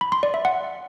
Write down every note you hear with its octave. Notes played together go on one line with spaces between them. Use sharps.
B5
C6
D5
E5
F#5